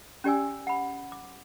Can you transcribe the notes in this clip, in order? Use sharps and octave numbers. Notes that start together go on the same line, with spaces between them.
C#4 G4 D5 G#5 E6
F#5 B5
D6